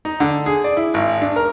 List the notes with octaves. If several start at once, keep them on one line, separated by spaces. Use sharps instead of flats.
D#4
D3
G#4
D5
E4
G#1
D4
A#4